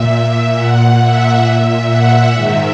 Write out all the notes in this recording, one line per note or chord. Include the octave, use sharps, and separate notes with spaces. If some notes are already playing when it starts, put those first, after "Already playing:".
Already playing: A#2 E5
A#2 F#5
E5
A#2
F#5
G#2 D#3 E5